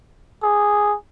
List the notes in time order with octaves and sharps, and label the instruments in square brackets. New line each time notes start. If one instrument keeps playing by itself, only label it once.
[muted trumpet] G#4